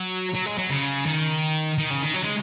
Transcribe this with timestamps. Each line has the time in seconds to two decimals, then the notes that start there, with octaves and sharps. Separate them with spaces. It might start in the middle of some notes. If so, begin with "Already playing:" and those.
Already playing: F#3
0.35 F#3
0.46 G#3
0.58 F#3
0.71 C#3
1.06 D#3
1.78 D#3
1.90 C#3
2.02 D#3
2.14 F#3
2.24 G#3